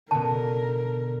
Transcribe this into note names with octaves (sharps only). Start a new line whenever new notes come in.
B2 D3 A#4 A5